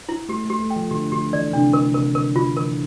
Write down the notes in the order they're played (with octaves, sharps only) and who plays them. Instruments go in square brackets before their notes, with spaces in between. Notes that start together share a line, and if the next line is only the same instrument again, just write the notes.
[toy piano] E4
[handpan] A3 [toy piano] G4
[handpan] A3
[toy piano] G4
[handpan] A3
[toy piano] G5
[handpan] F3
[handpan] D3 [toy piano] G4
[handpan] D3 [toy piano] G4
[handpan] E3 [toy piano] D5
[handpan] C3 [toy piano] D4
[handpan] D3 [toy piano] A#4
[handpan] C3 [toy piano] A#4
[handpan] D3 [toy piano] A#4
[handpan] D3 [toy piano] F4
[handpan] D3
[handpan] E3 [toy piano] A#4